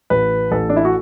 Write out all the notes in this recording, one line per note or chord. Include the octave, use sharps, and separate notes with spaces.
A1 B4
A1 A4
D4
E4
F#4